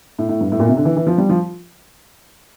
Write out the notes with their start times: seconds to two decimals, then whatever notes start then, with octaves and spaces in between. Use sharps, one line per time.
0.19 A2
0.29 A2
0.41 G2
0.52 A2
0.59 A#2
0.69 C3
0.77 D3
0.85 E3
0.97 E3
1.07 F3
1.18 G3
1.29 F3